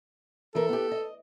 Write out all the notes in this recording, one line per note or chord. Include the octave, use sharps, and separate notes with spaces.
E3 A4 A#4
B3 G4
D#5